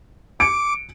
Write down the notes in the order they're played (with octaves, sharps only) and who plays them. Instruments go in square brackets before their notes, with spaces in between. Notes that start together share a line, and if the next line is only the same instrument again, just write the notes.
[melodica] D6 [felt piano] C#7 D7